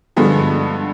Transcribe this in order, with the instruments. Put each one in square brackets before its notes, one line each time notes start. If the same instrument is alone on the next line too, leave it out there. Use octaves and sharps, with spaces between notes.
[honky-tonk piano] G2 D3 F3 G#3 B3